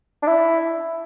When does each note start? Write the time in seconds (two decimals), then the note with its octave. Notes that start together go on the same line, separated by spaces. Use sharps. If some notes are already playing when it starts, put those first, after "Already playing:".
0.23 D4
0.28 E4